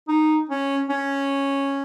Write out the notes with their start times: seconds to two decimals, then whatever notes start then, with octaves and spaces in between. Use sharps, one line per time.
0.08 D#4
0.49 C#4
0.90 C#4